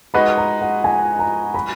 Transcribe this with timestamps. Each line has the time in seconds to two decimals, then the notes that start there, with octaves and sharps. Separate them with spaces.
0.14 G#3 D#4 F#4 B4 D#5 B5
0.37 A#5
0.61 F#5
0.84 G#5
1.19 A#5
1.54 B5